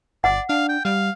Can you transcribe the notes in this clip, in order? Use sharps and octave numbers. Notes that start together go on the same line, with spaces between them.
G1 D5 F#5
D4 F5
G5
G3 F5